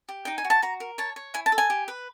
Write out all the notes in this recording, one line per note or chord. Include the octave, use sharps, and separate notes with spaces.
G4
D#4 G5
G#5
F#4
A5
F#4 A#5
A#4
C#5 A5
C#5
E4 G#5
A5
A4
G#5
G4
B4